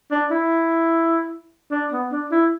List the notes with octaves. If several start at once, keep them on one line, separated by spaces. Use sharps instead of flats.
D4
E4
D4
B3
D4
E4